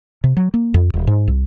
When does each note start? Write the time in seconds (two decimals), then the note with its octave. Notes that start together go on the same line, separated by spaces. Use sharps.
0.24 C3
0.37 F#3
0.54 A#3
0.74 F2
0.94 D#1
1.07 G#2
1.28 C2